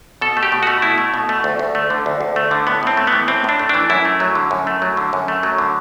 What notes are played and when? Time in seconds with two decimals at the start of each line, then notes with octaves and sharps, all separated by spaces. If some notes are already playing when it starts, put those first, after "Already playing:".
0.21 B2 A4
0.37 A3
0.43 G4
0.52 B2
0.63 A3 F#4
0.82 B2 E4
0.98 A3
1.14 B2
1.29 A3
1.44 D2
1.59 D2
1.75 A3
1.90 D3
2.06 D2
2.21 D2
2.36 A3
2.51 D3
2.67 A2 B3
2.83 A2 C4
2.97 A3
3.07 B3
3.12 E3
3.28 A2 C4
3.44 A2 D4
3.59 A3
3.69 E3 D4
3.90 F#2 E4
4.05 A3
4.20 F#3
4.35 D3
4.51 F#2
4.67 A3
4.82 F#3
4.97 D3
5.13 F#2
5.28 A3
5.43 F#3
5.58 D3